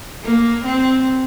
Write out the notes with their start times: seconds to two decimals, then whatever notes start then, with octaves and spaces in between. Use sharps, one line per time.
0.23 A#3
0.65 C4